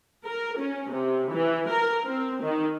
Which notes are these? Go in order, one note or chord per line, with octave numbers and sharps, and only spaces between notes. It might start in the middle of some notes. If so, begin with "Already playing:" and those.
A#4
C#4
C3
E3
A#4
C4
D#3